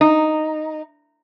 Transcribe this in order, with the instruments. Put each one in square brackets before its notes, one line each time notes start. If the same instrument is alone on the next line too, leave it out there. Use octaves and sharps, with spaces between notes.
[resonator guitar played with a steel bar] D#4